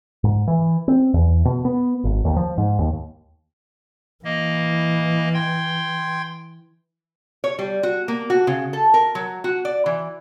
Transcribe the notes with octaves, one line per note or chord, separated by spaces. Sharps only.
G#2
E3
C4
E2
B2
B3
G#1
D#2
F3
G#2
D#2
E3 A#3 D#5
G5 C6 G#6
C#5
G3
F#4
A#3
F#4
C#3
A4
A#4
F#3
F#4
D5
E3